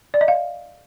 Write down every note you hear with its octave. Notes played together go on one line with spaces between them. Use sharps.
D5
D#5
F5